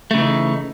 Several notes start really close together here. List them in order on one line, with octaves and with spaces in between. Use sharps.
A3 C#3 E3 D#4